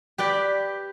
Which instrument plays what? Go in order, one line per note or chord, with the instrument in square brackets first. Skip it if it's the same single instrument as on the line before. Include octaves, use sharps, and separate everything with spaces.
[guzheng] G4 B4 D5 G5